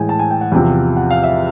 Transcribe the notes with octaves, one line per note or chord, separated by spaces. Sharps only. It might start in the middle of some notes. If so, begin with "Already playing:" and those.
Already playing: A2 E3 G#3 G5 G#5
A5
G#5
G5
F#5
E2 C3 F3 F#5
F#5
F5
E5